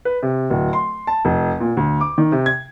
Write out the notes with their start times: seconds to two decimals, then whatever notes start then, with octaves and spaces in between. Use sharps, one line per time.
0.05 B4
0.23 C3
0.50 D1
0.73 C6
1.07 A5
1.25 F1
1.60 A#2
1.77 D2
2.01 D6
2.18 D#3
2.32 C3
2.46 G#6